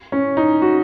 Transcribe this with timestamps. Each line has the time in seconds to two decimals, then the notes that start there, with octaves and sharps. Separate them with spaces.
0.12 C#4
0.37 D#4
0.62 F#4